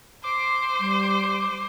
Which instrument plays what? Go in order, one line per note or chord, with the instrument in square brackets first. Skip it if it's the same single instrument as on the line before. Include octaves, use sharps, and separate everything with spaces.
[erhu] C5 [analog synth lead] D6
[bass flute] G3